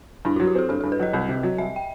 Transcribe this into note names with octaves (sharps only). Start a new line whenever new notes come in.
G2 E4
F#3 F#4
G4
C4 A4
G2 A4
G2 A4
B4
F#3 D#5
C2
C3
F#3
C2 E5
G5